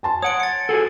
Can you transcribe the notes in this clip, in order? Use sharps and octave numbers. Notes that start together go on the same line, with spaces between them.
G#5 A5 C6
C#5 F#5 D#6 D7
A6 C#7
F#4 G#4 A4